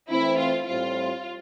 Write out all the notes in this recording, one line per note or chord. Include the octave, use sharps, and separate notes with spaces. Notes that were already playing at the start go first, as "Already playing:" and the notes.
E3 A3 C4 E4
F4
A2 G3 C4 F4